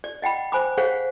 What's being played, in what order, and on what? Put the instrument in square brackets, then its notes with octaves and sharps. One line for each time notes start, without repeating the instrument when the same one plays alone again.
[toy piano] D5
D#5 F#5 G5 B5
C5 G#5 B5 D6
G#4 C5 C#5 F5 F#5